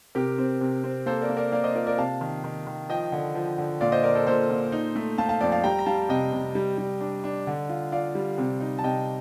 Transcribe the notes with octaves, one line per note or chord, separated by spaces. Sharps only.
C3 G4 A#4
C4
C3
C4
A#3 A4 C5
A#4 D5
A#3
A#4 D5
A#3 D5 F5
C5 D#5
F4 A#4 D5
A#4 D5
C3 F5 A5
D#3
D#3
D#3
F3 D#5 G5
D3
F3
D3
A#2 D5 F5
C5 D#5
A#2 A#4 D5
A4 C5
A#2 A4 C5
A#2
D#4
A3
A3 F5 A5
F5 A5
F2 D5 F5
F5 A5
G3 G5 A#5
A#5
G3 F5 A5
C3 D#5 G5
C3
G3
G3
D4
D4
D3
F4
F4 D5 F5
G3
C3
D#4
A5
C3 D#5 G5